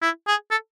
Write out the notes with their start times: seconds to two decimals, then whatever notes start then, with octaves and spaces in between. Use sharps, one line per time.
0.02 E4
0.27 G#4
0.51 A4